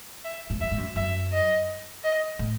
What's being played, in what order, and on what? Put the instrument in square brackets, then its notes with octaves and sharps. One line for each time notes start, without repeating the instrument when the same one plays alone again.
[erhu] E5
[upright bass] G#2
[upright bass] F#2 [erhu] E5
[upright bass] G#2
F#2
[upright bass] F#2 [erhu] E5
[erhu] D#5
D#5
[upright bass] A2